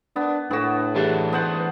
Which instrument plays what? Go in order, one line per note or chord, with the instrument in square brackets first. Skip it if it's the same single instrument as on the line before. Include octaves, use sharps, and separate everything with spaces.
[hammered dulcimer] B3 [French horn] D4
[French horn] A2 [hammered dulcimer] B3 F#4 [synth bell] D4 A4
[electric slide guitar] E3 A3 D4 [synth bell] G4 G#4
[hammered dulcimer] B3 C5 F#5